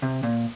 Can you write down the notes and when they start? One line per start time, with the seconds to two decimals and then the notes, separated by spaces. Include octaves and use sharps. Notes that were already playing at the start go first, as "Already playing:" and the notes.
0.02 C3
0.23 A#2